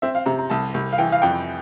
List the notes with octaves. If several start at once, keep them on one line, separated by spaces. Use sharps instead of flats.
C4 E5
F5
C3 A#5
A#5
C2 A5
C2
F5
E3 G5
F5
F2 G5